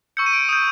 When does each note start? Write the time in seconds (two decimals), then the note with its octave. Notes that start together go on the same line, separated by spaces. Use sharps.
0.17 C#6 E6 G6 C#7
0.26 D#7
0.33 D7
0.49 D#6 G6 D#7